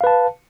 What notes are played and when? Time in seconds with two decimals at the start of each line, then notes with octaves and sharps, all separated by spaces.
0.01 F5
0.04 B4
0.07 A5